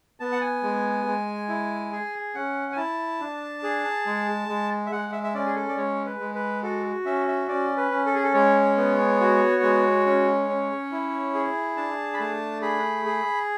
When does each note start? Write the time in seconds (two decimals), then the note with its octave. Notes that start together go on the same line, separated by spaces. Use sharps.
0.20 B3 A5
0.32 F#5
0.41 G#5
0.63 G#3
1.06 G#3
1.48 E4
1.92 G#4
2.35 C#4 F#5
2.72 G#5
2.77 E4 A5
3.20 D4
3.63 G#4
4.06 G#3
4.49 G#3
4.86 E5
4.92 G#3 F#5
5.12 E5
5.24 E5
5.34 C#4 D5
5.46 G#4
5.55 A4
5.69 D5
5.77 G#3 C#5
6.06 B4
6.20 G#3
6.34 B4
6.63 F#4 A4
7.05 C#4 E5
7.28 E5
7.48 C#4 D5
7.77 B4
7.91 C#4
8.06 A4
8.15 G#4
8.23 A4
8.34 G#3 C#5
8.77 B3
9.20 F#4
9.63 G#3
10.06 C#4
10.48 C#4
10.92 E4
11.34 G#4
11.77 D4 A5
12.14 B5
12.19 A3 A5
12.62 G#4 B5
13.05 G#4